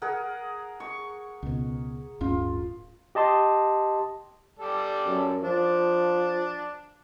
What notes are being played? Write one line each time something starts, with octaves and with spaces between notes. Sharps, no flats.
G#4 A#4 F#5
C#6
C#2 B2
D1 G2 C#4 F4
G4 D#5 A5 C6
G3 A4 D5
F#2
F3 D4